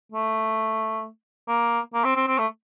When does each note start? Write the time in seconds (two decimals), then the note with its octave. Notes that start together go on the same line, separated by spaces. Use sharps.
0.12 A3
1.48 A#3
1.94 A#3
2.04 C4
2.16 C4
2.27 C4
2.38 A3